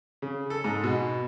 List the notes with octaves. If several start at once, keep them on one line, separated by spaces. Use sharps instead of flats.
C#3
A4
G#2
B2